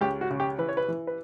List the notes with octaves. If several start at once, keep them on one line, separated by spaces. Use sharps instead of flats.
C#2 G4
F#4
C#3
G4
E3 B4
C#5
B4
E3
B4